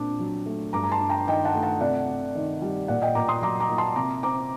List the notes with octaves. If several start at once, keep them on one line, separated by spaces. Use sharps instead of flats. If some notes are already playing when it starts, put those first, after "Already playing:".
Already playing: A#2 C4 D4 D6
F#3
A3
G2 A#5 D6
A#5
A5 C6
D4
G5 A#5
D#3 D#5 G5
F#5 A5
A3
F#5 A5
C3 D5 F#5
C3
D#3
G3
A#2 D5 F#5
D#5 G5
A#2 A#5 D6
C6 D#6
F#3 A#5 D6
A#5 D6
A#3
A5 C6
C3 A#5 D6
C4 A#5 D6